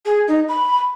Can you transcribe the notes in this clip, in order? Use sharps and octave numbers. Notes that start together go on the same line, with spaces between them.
G#4
D#4
B5